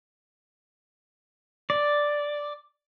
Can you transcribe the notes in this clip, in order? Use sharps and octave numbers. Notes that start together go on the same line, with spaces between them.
D5